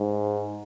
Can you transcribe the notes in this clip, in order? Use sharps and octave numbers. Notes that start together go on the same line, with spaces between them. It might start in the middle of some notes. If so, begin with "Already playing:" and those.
Already playing: G#2